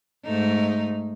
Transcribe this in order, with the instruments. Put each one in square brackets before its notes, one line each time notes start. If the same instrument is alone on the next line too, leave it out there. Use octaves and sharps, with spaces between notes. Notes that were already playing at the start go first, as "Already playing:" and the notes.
[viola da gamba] G#2 A3 D#4